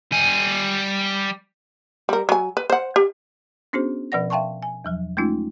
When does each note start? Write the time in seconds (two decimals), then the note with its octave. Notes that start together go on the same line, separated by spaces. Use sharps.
0.12 G3 G#5
2.09 G3 A#4
2.29 F#3 G#5
2.57 B4
2.70 C5 F#5
2.96 G4
3.73 B3 C#4 D4 F#4 G#4 C5
4.12 B2 F3 B4 D5 F#5 A#6
4.30 E5 F5 G5 A5 C6 C#6
4.63 G#5
4.84 E2 F3 F#3
5.17 G#3 A3 C#4 D#4 F4